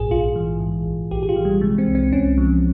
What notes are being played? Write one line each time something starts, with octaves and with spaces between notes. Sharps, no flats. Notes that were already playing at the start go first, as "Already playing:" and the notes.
Already playing: A#1 G#2 G#4
A#1 F4
E3
G#2
A#1
A#1 G4
G4
F4
E3
G3
C3 G#3
C4
C2
C4
C2 C#4
F3